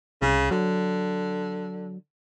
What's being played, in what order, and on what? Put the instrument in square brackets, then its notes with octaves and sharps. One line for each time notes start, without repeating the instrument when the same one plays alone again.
[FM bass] C2 [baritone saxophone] C#3
[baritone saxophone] D3 [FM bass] F#3